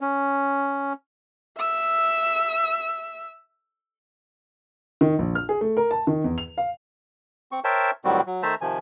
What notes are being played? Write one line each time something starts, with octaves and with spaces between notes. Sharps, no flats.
C#4
E5 E6
D#3
A#1
F6
G#4
A3
A#4
A5
D#3
E2
F7
F5
C4 C#6
A#4 C5 C#5 E5 G5 A5
A2 D#3 F#3 G3 C4 F#4
F#3
D#3 A3 C5 E5 A5 A#5
C3 D#3 F3 G#5